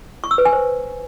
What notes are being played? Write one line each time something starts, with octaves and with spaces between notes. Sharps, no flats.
C#6
E6
B4
G#5
C5